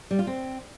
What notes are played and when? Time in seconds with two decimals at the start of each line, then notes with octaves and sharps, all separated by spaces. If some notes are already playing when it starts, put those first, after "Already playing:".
0.11 G3
0.19 F4
0.27 C4